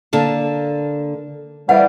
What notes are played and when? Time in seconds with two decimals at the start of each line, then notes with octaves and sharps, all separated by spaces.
0.13 D3 A#3 A5
1.69 F2 E3 G3 F5 F#5